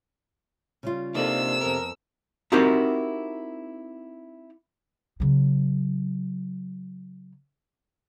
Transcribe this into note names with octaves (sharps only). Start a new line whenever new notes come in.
C#3 G3 F4
C3 A#3 D4 D#4 F4 A4 E6
F2 B3 A#4
C4 D#4 E4 F#4 G4 A#4
C#3 F#3